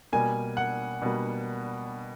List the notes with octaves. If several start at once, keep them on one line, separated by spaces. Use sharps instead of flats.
B2 G3 A#3 G#5
F#5
B2 G3 A#3